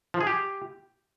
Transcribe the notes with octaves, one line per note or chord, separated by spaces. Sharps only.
F3
G#4
G4